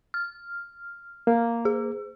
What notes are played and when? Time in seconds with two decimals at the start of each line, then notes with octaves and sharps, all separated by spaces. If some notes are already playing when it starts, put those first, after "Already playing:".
0.14 F6
1.27 A#3
1.65 G#4